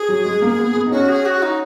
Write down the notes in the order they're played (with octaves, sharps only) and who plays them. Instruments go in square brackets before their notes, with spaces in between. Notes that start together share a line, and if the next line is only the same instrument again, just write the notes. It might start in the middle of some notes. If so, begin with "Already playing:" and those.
Already playing: [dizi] G#4
[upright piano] F#3
G#3
A#3
B3
B3
D#4
[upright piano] C#4 [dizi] F#4
[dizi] G#4
F#4
D#4